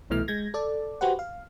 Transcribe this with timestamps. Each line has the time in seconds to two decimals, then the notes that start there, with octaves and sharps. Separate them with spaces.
0.10 C2 B2 E3 A3 F6
0.28 G#3 G6 G#6 A#6
0.54 A4 D5
1.01 F#4 G4 B4 C5 F#5
1.19 F5